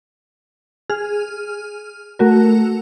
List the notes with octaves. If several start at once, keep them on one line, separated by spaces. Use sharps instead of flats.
G#4 F6
A3 F#4 A#4